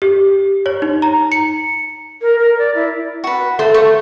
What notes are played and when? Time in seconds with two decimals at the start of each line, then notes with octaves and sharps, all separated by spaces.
0.02 G4
0.66 C#5
0.82 D#4
1.02 A#5
1.32 C#7
2.21 A#4
2.39 A#4
2.58 D5
2.75 E4
3.24 F#4 B4
3.59 A3 C5
3.74 A3 C#6